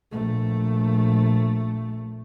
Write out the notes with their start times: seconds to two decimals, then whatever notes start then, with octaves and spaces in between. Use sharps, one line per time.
0.12 A#1 A3